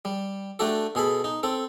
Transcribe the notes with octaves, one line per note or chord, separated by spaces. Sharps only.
G3
A3 D4 F#4 G4 A4
B2 G#4 A4 B5
D#4
C4 A4